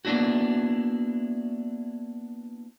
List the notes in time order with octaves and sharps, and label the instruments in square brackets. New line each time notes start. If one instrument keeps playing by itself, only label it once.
[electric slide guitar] A#3 B3 D4 E4 F#4